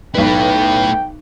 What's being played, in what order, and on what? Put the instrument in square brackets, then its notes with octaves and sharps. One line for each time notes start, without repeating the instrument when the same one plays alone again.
[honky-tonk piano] B1 B4 [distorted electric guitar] A3 E4 [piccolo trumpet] G5